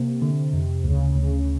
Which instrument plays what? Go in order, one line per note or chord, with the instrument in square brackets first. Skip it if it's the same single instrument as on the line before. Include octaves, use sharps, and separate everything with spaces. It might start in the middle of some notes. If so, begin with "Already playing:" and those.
Already playing: [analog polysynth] C3 [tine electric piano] A#3
[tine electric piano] D3
F2
[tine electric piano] D2 [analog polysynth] C#3
[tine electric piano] D2